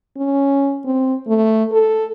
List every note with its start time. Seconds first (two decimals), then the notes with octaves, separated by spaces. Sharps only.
0.17 C#4
0.85 C4
1.27 A3
1.72 A4